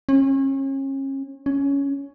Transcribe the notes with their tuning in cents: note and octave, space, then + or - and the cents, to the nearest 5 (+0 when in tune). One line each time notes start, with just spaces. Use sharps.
C#4 -35
C#4 +10